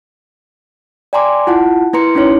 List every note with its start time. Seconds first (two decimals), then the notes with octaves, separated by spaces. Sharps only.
1.13 D5 G5 G#5 A#5 C6 D6
1.47 E4 F4 F#5 A5
1.93 A#3 E4 B4 A#5 C6 C#7
2.15 A#3 C#4 D#4 E4 C#5